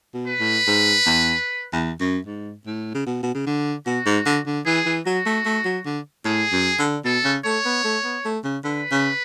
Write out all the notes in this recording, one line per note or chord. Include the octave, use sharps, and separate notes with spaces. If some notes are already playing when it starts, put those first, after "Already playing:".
B2
B4
A2
G#2
E2
E2
F#2
G#2
A2
C#3
B2
B2
C#3
D3
B2 F#4
G#2
D3
D3
E3 G#4
E3
F#3 F#4
A3
A3
F#3
D3
A2 G#4
F#2
D3
B2 A4
C#3
A3 C#5
B3
A3
B3
A3
C#3
D3 B4
C#3